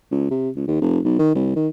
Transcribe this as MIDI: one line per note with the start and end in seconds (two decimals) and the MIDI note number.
0.11 0.27 37
0.30 0.50 48
0.55 0.65 37
0.67 0.79 39
0.81 0.99 29
1.05 1.14 35
1.19 1.31 51
1.35 1.55 36
1.56 1.68 51